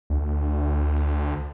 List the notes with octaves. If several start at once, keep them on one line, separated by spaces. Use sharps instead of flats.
D2